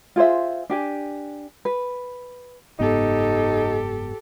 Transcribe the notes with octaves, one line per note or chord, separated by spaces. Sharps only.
F4 G#4 C5 E5
D4 G4 G#5
B4
F#1 G#2 B3 D#4 G4 A4